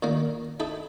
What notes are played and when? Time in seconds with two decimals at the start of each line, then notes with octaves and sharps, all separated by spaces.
0.03 A#2 D#3 A#3
0.60 D#4 E4 A4